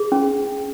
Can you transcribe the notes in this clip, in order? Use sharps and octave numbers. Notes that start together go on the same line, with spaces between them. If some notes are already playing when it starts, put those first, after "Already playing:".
Already playing: G#4
C#4